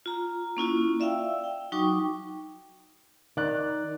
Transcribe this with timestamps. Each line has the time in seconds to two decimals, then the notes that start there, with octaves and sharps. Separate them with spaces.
0.06 F4 A#5
0.57 A#3 C#4 E4 F4
1.00 D5 E5 F5 G5 E6
1.44 G5
1.72 F#3 D#4 F#4 G5 C#6 D6
3.37 D#3 D5 F#6